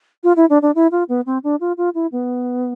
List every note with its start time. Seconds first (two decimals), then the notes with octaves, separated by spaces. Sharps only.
0.24 F4
0.36 E4
0.50 D4
0.62 D4
0.75 E4
0.92 F4
1.09 B3
1.26 C4
1.44 D4
1.61 F4
1.78 F4
1.95 E4
2.12 B3